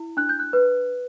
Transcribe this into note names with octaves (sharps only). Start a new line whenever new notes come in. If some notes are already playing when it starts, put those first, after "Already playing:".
Already playing: E4
D4 F#6
G6
F#6
B4